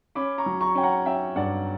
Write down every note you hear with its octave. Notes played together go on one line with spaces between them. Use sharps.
C#4 B5 D6
A#5 C#6
F#3
A#5 C#6
C#4 G5
F#5 A#5
C#4 E5 G5
G2 D5 F#5